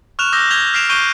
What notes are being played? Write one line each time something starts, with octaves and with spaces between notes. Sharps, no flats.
C#6 F6 F#6 E7 F7
D6 E6 G6 A#6 G7
G6 G#6 A#6 B6 F7 G7
F6 B6 C7 D7 E7 F7
C#6 G6 C7 D7 D#7 G7